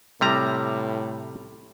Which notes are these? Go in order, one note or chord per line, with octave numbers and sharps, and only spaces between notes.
A2 C3 G3 A#5